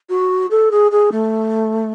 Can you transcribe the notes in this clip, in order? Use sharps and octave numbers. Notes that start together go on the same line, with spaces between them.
F#4
A4
G#4
G#4
A3